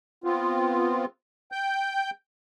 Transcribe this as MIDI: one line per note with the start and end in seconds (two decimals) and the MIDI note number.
0.24 1.05 59
0.24 1.05 60
0.24 1.05 65
1.52 2.10 79
1.52 2.10 91